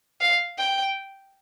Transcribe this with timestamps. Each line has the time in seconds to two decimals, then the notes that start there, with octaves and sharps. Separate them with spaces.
0.20 F5
0.58 G5